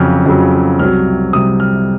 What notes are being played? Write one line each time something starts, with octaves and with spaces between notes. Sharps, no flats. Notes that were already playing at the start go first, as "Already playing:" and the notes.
Already playing: F2 C#3 F#3 F6
F2 C#3 F#3
C2 C3 F#3 F6
C2 C3 F#3 D#6
F6